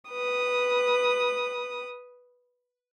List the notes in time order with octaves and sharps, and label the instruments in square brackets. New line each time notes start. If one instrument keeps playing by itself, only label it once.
[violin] B4 D#6